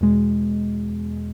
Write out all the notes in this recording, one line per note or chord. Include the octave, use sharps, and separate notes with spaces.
E2 B2 G#3